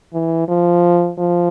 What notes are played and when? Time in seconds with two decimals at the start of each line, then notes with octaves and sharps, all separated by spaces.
0.14 E3
0.48 F3
1.19 F3